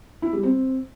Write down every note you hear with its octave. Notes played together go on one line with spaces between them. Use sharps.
E4
G3
C4